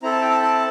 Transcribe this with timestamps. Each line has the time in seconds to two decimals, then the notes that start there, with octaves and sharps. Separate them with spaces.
0.03 C4 E4 A4 A#5
0.12 A5
0.21 G5
0.30 A5
0.42 A5